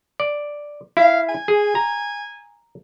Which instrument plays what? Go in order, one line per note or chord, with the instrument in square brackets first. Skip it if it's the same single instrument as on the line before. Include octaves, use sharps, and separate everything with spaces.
[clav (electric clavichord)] D5
[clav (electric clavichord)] E4 [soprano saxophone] F5
[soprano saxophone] G#5
[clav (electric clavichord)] G#4
A#5